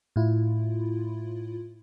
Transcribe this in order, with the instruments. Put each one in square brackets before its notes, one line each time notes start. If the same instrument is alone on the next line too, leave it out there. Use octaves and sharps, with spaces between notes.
[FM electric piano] A2 E4 F4